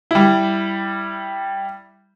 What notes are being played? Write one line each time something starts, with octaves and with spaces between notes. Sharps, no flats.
G3 E4